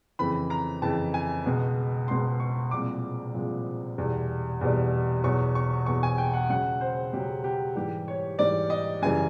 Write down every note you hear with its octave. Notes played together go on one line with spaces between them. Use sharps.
F2 C#3 E3 B5
A#5
F2 C#3 E3 A5
G#5
C#2 B2 G#3
C#2 B2 G#3 C6
C#6
C2 A#2 F3 G#3 D6
C2 A#2 F3 G#3
E2 B2 G3
E2 B2 G3
E2 B2 F#3 C#6
C#6
E2 B2 F#3 C#6
G#5
G5
F#5
C#2 C#3 F#3 F#5
C5
C#2 C#3 F#3 G4
G4
G#2 E3 G3 G4
C#5
G#2 E3 G3 D5
D#5
F#2 C#3 E3 G3 G#5